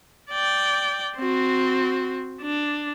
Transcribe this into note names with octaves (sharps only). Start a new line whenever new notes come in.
D5 G5
C4 F#4
D4